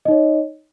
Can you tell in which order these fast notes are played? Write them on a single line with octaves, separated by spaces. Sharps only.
D#5 D#4 C#5